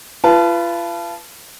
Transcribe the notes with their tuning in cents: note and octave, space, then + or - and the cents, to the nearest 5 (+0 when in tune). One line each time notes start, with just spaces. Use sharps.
F4 -35 B4 +0 A5 -15